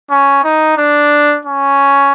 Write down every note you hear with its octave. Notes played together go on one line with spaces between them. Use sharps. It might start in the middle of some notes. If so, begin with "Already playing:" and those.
C#4
D#4
D4
C#4